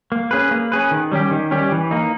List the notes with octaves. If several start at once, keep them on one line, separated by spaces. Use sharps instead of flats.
A#3
C#4 G#4 B4
A#3
C#4 G#4 B4
D#3
G3 C#4 G4
D#3
G3 C#4 G4
E3
A#3 D#4